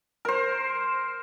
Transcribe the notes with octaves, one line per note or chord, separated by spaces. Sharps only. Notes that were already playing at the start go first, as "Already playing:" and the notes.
A#4 C5